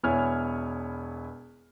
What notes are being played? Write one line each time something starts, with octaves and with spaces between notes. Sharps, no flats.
E1 B3 E4 C#5 G#5 F6